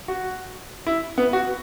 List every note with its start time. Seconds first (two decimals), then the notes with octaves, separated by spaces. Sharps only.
0.08 F#4
0.87 E4
1.18 B3
1.33 F#4